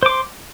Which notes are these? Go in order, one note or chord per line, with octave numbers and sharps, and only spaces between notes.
C5 C6 D6